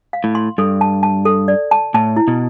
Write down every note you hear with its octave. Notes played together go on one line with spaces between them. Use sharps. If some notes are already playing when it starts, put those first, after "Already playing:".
F5
A2
C6
G2 A4
A5
A5
A4
D5
A5
A2 A5
E4
B2